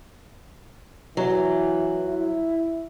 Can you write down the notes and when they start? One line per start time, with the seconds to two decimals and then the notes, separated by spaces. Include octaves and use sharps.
1.17 E3 F#3
2.07 E4